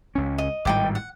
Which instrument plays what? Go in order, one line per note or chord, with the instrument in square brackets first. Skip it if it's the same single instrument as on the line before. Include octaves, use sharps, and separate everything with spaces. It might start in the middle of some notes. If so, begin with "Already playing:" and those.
[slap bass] C#2 C#4
[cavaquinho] D#5
[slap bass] G#1 A2 G3 [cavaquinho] D#4 G5 D6
[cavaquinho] F#5